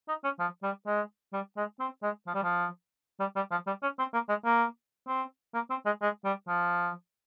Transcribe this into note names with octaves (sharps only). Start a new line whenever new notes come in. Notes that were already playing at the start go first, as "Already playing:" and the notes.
D#4
C#4
F3
G3
G#3
G3
G#3
C4
G#3
F3
G3
F3
G3
G3
F3
G3
C#4
C4
A#3
G#3
A#3
C4
A#3
C4
G#3
G#3
G3
F3